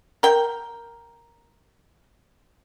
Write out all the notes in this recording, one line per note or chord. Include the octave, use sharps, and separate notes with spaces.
A#4 G5